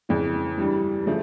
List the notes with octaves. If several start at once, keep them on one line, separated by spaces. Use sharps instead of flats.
F2 C#3 E3 G#3
G2 E3 G3
C#3 F3 A3